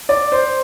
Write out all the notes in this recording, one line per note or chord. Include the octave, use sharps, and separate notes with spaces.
D5
C5